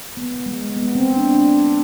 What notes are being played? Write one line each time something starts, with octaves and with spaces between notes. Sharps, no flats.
B3
G#3
B3
C4
D4
D4